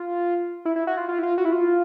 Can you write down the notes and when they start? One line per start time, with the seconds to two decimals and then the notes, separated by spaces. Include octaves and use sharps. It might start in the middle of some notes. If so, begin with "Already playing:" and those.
Already playing: F4
0.65 E4
0.76 E4
0.87 F#4
0.97 F4
1.09 F4
1.19 E4
1.23 F4
1.38 F#4
1.45 E4
1.52 F4